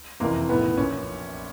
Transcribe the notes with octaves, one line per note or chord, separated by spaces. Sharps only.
F#1 F2 C3 E3 A#3
B1 A2 E3 B3
A#1 A#2 C#4